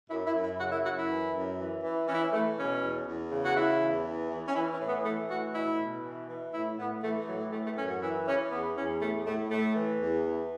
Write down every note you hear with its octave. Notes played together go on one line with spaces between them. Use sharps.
F#2 E4
E4
F#2
E4
C#3 F#4
E4
F#2 F#4
E4
E3
F#2
E3
E3
E3 C#4
E4
C#4
E3 A3
B2 C#4
E2
E2
C#3
F#4
E3 E4
E2
E3
E3
C#4
E3 E4
C#4
A2
B3
E3 A3
A2 F#4
B2 E4
B2
E3
E3
A2 E4
A2 B3
E3 A3
A3
A2 F#3
E3 A3
A3
F#2 C#4
F#4
E3 E4
E3 C#4
E2 B3
E2 C#4
A2 A3
A2 A3
A2 A3
E3
E2
E3